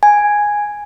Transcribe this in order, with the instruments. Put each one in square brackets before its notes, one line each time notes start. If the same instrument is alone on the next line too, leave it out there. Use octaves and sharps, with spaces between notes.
[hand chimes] G#5